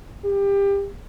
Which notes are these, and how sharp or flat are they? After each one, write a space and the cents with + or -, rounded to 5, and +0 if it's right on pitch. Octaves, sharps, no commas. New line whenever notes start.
G4 +25